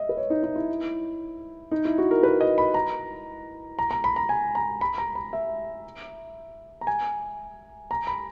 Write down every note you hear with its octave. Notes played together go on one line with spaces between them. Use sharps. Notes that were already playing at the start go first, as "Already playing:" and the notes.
Already playing: D#5 E5
B4
C#5
D#4
D#4
E4
D#4
E4
F#4
A#4
B4
D#5
B5
A#5
A#5
A#5
B5
A#5
G#5
A#5
B5
A#5
B5
E5
A#5
G#5
A#5
B5